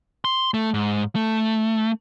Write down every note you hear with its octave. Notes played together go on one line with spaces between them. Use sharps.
C6
A3
G#2
A3